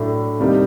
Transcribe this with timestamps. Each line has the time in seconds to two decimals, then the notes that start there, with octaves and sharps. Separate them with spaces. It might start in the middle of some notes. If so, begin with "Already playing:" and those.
Already playing: A2 F#3 A3 D4
0.40 C3 D#3 G3 A#3 D#4